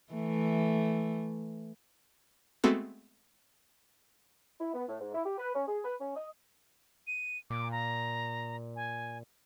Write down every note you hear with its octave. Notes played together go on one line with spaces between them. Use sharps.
E3 A3
G#3 A3 B3 C4 F#4 A4
E4
B3
A2
G#2
E4
G4
B4
C#4
G#4
B4
C#4
D#5
D#7
A#2 D6
A#5
G#5